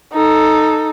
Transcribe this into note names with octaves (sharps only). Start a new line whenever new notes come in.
D#4 A4